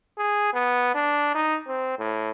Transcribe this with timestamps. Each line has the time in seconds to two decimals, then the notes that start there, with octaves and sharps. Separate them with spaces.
0.18 G#4
0.54 B3
0.95 D4
1.35 D#4
1.68 C4
1.99 A2